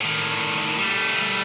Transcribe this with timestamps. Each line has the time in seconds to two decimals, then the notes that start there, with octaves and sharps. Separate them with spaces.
0.01 A2 D#3
0.78 G3 A3